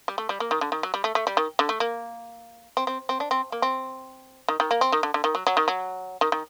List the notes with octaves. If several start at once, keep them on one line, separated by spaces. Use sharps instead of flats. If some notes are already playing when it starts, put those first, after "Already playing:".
G3
A3
G3
A#3
D#3
D3
D#3
F#3
G3
A3
A3
G3
D#3
D3
A3
A#3
C4
C4
C4
D4
C4
A#3
C4
D#3
D#3
A#3
C4
D#3
D3
D3
D#3
F#3
F#3
D#3
F#3
D#3
D#3